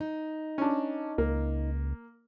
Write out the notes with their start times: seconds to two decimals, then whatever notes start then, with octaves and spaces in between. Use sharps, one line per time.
0.01 D#4
0.58 C#4 D4
1.18 C#2 A#3